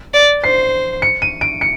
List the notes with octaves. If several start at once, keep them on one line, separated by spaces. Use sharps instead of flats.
D5
C5 C7
C#7
D#7
D7
C#7